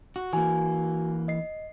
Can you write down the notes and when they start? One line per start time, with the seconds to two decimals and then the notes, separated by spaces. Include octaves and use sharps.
0.16 F#4
0.33 E3 A#3 F#4 G#5
1.28 D#5 C7